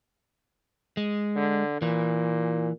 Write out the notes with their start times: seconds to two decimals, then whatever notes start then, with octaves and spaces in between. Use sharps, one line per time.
0.97 G#3
1.36 D3
1.82 A#2 E3